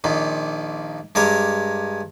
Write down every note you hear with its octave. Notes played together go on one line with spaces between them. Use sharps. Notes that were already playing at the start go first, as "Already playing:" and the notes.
A#1 A#2 D#3
G2 G#3 A#4 C#5 D6